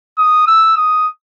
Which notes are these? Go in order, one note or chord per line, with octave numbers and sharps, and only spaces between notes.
D#6
E6
D#6